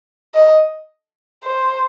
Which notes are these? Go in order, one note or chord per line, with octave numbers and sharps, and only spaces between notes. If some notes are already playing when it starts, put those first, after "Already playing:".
D#5
C5